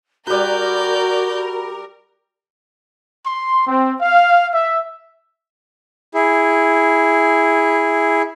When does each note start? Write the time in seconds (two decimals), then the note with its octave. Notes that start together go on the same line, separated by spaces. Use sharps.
0.27 G3 F#4 A#4 B4 D5 G6
3.26 C6
3.67 C4
4.01 F5
4.53 E5
6.14 E4 G#4